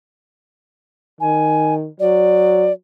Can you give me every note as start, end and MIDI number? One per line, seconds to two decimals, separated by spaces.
1.20 1.88 51
1.20 1.74 80
2.00 2.70 54
2.00 2.72 74